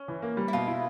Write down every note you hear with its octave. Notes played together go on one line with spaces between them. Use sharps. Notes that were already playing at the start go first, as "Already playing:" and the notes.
Already playing: C#4
E3
A#3
G3
E4
B2 F4
E4